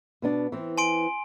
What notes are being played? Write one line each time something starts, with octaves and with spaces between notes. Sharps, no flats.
B2 B3 D4
E3 C4
G#5 C6 D7